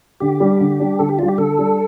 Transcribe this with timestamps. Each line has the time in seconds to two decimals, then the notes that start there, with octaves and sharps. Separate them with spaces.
0.20 D3 G4
0.40 G3 D4
0.61 D3
0.79 G3 D4
0.99 D3 A4
1.09 G4
1.19 G3 D4 F4
1.28 G4
1.38 D3 A4
1.58 G3 D4